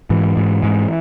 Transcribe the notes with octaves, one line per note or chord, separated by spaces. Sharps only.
G#2 E3
G#2
G#2